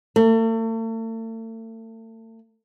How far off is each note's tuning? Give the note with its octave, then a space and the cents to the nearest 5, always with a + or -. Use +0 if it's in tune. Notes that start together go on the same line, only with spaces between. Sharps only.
A3 +40